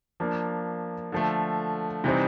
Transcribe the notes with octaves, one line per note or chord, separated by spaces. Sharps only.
F3 A#3 D4
D3 F3 A3
C3 E3 G3 C4 D#4